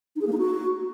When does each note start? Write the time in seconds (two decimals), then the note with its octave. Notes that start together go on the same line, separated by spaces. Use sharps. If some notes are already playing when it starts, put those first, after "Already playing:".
0.16 D#4
0.21 G#4
0.27 A#3
0.32 D#4
0.38 F#4